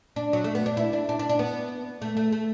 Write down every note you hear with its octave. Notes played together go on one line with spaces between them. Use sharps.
D4
F#3
A3
B3
D4
E4
D4
D4
D4
D4
B3
A3
A3
A3